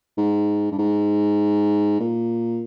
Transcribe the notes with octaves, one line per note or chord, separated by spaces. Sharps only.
G#2
G2
G#2
A#2